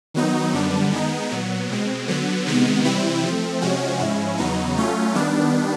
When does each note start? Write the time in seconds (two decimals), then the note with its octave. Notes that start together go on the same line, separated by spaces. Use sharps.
0.14 D#3 F#3 B3 D#4
0.53 F#2 D3 G3 B3 D4
0.92 D#3 G#3 B3 D#4
1.30 A#2 F#3 B3
1.69 B2 G#3 C4
2.08 D3 F#3 B3
2.46 C3 D#3 G#3 B3
2.84 C3 E3 G3 C4 E4
3.23 F3 A3 C4
3.62 C3 F3 G#3 C#4 F#4
3.99 G#2 F3 G#3 C#4 E4
4.38 E2 C#3 F#3 B3 D#4
4.77 F#3 A3 C#4 F4
5.15 D#3 G3 B3 D4